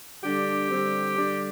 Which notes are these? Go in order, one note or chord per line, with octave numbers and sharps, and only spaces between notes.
D3 G3 D4 G4
D3 G3 C4
D3 G3 D4